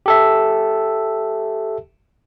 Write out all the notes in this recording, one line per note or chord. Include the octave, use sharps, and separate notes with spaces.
G4 A4 E5